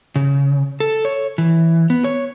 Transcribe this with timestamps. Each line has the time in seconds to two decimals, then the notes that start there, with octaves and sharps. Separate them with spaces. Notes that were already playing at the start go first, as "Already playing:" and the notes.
0.16 C#3
0.80 A4
1.05 C#5
1.38 E3
1.90 B3
2.04 C#5